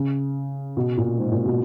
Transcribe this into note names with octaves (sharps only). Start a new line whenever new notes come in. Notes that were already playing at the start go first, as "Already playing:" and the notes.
Already playing: C#3
B2
A#2
G#2
A#2
B2